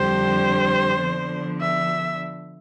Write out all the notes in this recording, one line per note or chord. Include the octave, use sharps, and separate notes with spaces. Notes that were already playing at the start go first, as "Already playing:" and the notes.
Already playing: F2 D3 G3 D4 G4 C5
D3 F3 B3 D4
E5